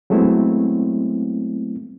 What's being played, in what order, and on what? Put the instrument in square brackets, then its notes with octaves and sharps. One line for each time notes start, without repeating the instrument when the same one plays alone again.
[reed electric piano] F#3 G#3 A3 B3 C4 E4